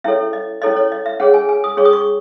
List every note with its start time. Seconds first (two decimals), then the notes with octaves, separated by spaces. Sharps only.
0.04 C#4 E4 A4 C#5 E5
0.33 D#5
0.62 C#4 E4 A4 C#5 D#5
0.76 C#5
0.92 D#5
1.06 E5
1.20 C#4 G#4 C#5 F#5
1.34 G#5
1.49 G#5
1.64 D#6
1.77 C#4 G#4 C#5 C#6
1.85 D#6
1.93 C#6